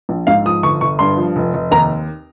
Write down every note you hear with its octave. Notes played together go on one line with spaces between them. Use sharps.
A#1
G#2 F5
F3 D#6
G1 C#6
G1 C#6
G2 C6
F3
F1
F1
D#2 A#5